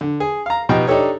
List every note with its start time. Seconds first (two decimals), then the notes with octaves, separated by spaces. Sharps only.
0.01 D3
0.20 G#4
0.46 F5 A#5
0.69 B2 F3 D#4 G4 G5
0.87 D4 D#4 G4 A4 C#5